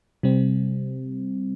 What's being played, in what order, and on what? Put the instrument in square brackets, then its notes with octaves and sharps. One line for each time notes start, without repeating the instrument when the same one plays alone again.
[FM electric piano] C3 G3 C4